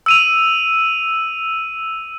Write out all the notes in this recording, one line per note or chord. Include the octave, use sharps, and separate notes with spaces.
E6 D#7 F7